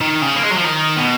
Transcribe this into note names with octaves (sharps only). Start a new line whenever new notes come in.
D#3
C#3
A#3
G#3
F#3
F3
D#3
B2